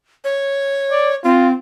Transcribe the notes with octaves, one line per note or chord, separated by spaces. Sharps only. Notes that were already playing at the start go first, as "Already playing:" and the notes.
C#5
D5
C4 F4